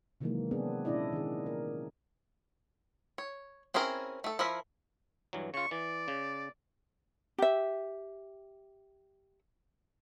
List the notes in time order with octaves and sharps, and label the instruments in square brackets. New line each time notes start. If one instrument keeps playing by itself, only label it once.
[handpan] C3 D#3 E3 F#3 G#3 A#3
B3 C4 D4 G#4
A#2 C#4 D4 E4 D5 D#5
D#3 G#4
A#4
[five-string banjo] C#5
C4 C#4 E4 G#4 A#4
A3 A4
F3 E4 A#4 E5
[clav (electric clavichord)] G2 E3 F#3
[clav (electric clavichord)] C#3 F4 [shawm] C#6
[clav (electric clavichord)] E3 [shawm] D5
[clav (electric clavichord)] C#3
[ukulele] G4 E5